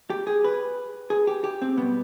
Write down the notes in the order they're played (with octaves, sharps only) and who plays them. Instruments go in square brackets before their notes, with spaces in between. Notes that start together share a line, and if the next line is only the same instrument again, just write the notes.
[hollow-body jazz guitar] G4
G#4
B4
G#4
G4
G4
C4
B2 G3 B3